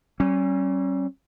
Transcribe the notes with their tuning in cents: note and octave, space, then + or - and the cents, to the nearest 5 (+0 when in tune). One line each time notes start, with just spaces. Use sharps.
G3 -45 C#4 -25